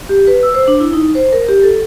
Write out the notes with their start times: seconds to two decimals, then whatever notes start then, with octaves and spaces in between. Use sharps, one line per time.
0.09 G4
0.27 B4
0.43 E6
0.55 C5
0.68 D4
0.80 E4
0.93 D#4
1.15 C5
1.33 A#4
1.49 G4
1.63 A4